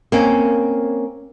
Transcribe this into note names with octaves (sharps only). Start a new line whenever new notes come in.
A#3 C4 C#4